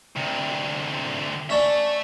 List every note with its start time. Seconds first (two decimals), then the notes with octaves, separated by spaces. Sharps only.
0.16 D2 C3
1.50 C#4 D4 E5 A5